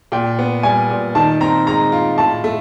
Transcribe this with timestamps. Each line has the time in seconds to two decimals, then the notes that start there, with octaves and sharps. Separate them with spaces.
0.12 A#2 G5
0.39 B3
0.63 G3 G#5
0.90 A#2
1.15 D#3 A5
1.41 C4 A#5
1.67 G#3 A#5
1.92 F4
2.18 A2 A5
2.44 A3